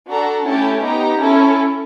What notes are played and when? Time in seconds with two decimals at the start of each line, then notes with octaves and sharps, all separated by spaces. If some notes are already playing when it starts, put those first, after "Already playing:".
0.10 D4 F#4 A4 A#5
0.47 A3 C#4 E4 G4 A5
0.83 B3 D#4 G4 A#5
1.21 C#4 E4 A4